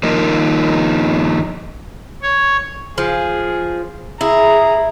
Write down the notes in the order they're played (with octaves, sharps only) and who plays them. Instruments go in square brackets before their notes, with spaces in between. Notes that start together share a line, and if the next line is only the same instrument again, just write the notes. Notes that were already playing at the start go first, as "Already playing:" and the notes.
[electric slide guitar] D#3 F3 A#3 D#4
[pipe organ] C#5
[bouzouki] F3 [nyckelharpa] G#4
[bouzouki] E4 [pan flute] G#4 [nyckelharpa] A#5